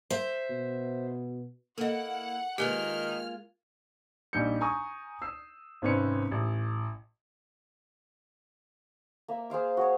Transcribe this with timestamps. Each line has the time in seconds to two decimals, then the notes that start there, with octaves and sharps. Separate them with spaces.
0.10 C5 E5
0.50 B2
1.78 A#3 E4 A4 D#5 F#5
2.58 D#3 G#3 A#3 F4 G4 B4 F6
4.33 A#1 G3 D#4 G6 C#7
4.61 G#5 A#5 C#6 D#6
5.22 E6 C7
5.82 G#1 C3 C4 C#4 B4 C#7
6.31 A1
9.28 A#3 E5
9.50 G#4 C5 F5 D6
9.77 F#4 G#4 C#5